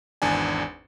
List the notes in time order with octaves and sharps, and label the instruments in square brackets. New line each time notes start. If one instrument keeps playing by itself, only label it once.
[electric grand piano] G#1 E2 D4 G#5